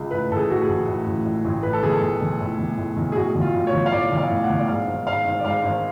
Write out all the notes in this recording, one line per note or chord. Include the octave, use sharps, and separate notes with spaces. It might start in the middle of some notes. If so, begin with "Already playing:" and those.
Already playing: C#2
A2 B4
A1 A4
G#4
A2 F#4
G#4
A1
A2
A1
A2
A1
A2 B4
A4
B1 G#4
A4
A2
B1
A2
B1
A2
B1
G#4
A2 F#4
B1
F4
A2
C#5
B1
F5
A2 D5
B1
F5
A2
F#5
B1
D5
G#2 F5
G#1
G#2 F5
G#1
D5
G#2 F5
G#1